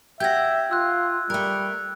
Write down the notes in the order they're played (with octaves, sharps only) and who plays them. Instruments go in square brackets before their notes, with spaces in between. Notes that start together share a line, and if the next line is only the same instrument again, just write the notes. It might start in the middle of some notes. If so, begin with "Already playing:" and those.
[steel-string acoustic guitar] G4 F#5 [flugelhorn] E5 [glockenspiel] G6 G#6 A#6
[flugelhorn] F4 [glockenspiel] E6 F#6
[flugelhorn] G3 [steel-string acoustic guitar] A3 A#4 [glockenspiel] F#6